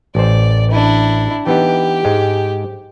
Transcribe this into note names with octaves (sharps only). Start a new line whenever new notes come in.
A1 C5 D5
D4 E4
E3 B3 D#4 G4
G#2 G#3